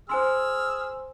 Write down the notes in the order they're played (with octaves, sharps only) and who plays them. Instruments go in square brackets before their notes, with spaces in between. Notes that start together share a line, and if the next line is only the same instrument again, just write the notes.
[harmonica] G#4 E6 F6 [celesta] C5 G#5 C6